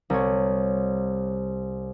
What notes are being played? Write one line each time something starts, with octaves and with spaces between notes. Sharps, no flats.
C2 C#5